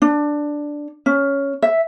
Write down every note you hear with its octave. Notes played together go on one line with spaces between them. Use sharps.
D4
C#4
E5